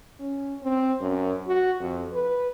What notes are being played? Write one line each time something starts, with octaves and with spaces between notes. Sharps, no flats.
C#4
C4
F#2
F#4
F2
B4